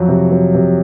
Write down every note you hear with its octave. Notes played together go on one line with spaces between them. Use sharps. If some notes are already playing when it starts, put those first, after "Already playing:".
Already playing: F2 F#3
C3
F#3
C3